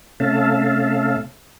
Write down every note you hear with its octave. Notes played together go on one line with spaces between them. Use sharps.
C3 A3 C#4 E5 F5 A5